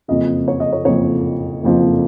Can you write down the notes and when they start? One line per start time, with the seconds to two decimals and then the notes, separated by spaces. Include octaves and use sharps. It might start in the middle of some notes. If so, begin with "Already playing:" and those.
0.08 F#1 F2 F3 D#5
0.48 C#5
0.60 D#5
0.73 C#5
0.85 F#1 F2 F3 C#5
1.63 F#1 F2 F3